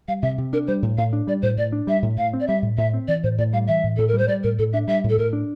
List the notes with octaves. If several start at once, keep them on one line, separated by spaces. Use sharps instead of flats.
G3 F5
C3 E5
C3
D4 A#4
G3 C5
A2
A2 F5
D4
G3 D5
A2 C5
A2 D5
D4
G3 E5
A2
A2 F5
C4
D5
G3 E5
A2
A2 E5
C4
E3 D5
A2 C5
A2 D5
G3 F5
E3 E5
A2
A2 A4
A#4
G3 C5
G3 D5
A2 A#4
A2 A4
D4 E5
G3 E5
A2
A4
A2 A#4
D4